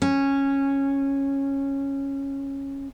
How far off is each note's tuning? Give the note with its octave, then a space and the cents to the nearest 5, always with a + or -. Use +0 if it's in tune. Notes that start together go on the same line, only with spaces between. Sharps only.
C#4 -10